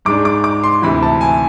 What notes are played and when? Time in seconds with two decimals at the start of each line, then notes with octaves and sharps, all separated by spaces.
0.05 G#2 G#3 D4 D6
0.25 D6
0.44 D6
0.64 C6
0.82 D2 C3 E3 B5
1.03 A5
1.21 G#5